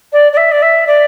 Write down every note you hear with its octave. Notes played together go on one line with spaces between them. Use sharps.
D5
D5
E5
D5
E5
D5